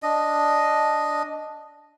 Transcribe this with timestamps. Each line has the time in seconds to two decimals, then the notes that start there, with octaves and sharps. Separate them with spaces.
0.03 D4 D#5